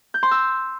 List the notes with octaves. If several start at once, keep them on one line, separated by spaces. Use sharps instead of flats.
G6
C6
E6